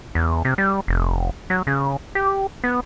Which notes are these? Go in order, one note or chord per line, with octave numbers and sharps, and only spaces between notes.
E2
C3
G3
F1
F#3
C#3
G4
B3